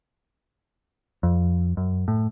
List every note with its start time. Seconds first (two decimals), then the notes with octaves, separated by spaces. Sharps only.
1.23 F2
1.77 F#2
2.08 A2